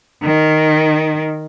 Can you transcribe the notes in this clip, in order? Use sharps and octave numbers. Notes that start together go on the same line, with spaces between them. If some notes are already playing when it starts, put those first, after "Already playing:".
D#3